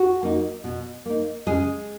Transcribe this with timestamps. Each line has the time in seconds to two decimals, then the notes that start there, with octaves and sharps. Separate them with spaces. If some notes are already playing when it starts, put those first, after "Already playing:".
Already playing: F#4
0.23 A#3 D#4
0.64 B2
1.06 A#3 D#4
1.47 C#3 G#3 G#4